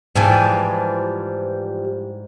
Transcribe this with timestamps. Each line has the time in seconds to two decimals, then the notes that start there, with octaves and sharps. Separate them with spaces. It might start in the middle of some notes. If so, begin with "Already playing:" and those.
0.15 G#2 E3 F3 G3 G#5